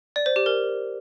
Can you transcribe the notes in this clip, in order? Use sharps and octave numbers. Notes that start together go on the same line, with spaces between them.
D5
C5
G4
A#4